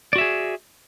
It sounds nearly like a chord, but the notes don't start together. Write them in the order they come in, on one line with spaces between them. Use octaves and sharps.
D5 F#4 E5 G#4